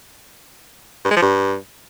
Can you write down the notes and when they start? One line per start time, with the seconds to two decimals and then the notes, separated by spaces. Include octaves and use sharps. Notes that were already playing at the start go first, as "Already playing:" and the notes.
1.05 G2
1.11 G#3
1.17 F3
1.22 G2